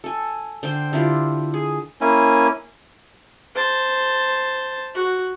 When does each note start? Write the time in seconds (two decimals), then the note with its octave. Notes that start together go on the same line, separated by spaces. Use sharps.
0.04 A4 G#5
0.63 D3 C5 G5
0.93 D3 E4 F4 G4
1.54 G#4
2.01 A#3 C#4 E4 G#5
3.55 C5 A5
4.94 F#4